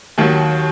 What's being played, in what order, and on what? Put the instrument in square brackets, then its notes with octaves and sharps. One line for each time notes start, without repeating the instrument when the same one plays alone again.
[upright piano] D#2 D#3 F#3